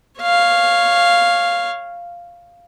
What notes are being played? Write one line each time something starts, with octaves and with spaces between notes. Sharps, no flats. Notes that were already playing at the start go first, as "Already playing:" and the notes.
C#5 F5